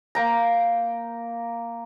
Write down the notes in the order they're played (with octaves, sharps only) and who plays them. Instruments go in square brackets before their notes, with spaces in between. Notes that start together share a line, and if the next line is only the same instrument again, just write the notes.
[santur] A#3 G5 A#5